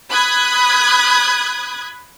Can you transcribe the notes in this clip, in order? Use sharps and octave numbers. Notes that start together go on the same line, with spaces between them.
B5 D#6 F#6 G#6